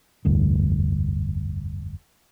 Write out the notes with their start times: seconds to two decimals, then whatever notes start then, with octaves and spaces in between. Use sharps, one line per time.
0.25 F1 D2 G2